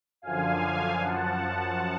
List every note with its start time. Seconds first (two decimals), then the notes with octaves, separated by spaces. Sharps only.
0.22 F#2 D3 F3 F5 G#5
1.01 F#2 F3 F#5 A5
1.42 F#5 A5